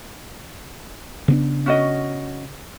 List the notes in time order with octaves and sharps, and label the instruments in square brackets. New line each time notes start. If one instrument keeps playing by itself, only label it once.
[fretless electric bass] C#3 B3 D4
[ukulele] C#4 F#4 D#5